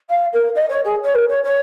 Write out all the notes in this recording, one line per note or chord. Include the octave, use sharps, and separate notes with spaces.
F5
A#4
D#5
C#5
G#4
C#5
A#4
C#5
C#5